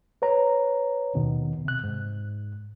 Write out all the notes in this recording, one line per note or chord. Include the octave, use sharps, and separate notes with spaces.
B4 C#5 A#5
D#2 B2 D#3
C3 F#6
G#2